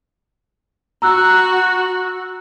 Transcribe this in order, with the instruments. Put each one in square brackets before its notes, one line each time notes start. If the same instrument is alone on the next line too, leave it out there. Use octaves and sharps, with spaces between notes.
[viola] F#4 [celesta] A#5 E6 F#6